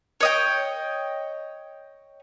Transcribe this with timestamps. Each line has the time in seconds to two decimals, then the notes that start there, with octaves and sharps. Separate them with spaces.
0.21 C#5 D#5 G5